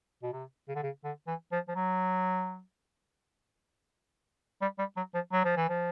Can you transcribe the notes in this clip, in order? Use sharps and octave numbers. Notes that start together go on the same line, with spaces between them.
B2
C3
C#3
D3
C#3
D3
E3
F3
F3
F#3
G3
G3
F#3
F3
F#3
F3
E3
F3